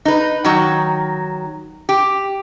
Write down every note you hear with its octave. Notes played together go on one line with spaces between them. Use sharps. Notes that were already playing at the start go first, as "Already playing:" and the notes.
D#4 B4
D#3 F#3
G4